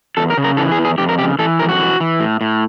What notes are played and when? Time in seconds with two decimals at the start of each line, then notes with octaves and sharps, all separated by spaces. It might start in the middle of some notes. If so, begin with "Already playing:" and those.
0.17 E2 A4
0.30 A#4
0.37 C#3
0.44 A#4
0.57 E3 A4
0.72 G#4
0.78 E2
0.85 G#4
0.98 F2 G4
1.09 A#4
1.18 C#3 G4
1.39 E3 A4
1.59 F2 A#4
1.69 F#4
1.79 E3
2.00 E3
2.20 A2
2.41 A2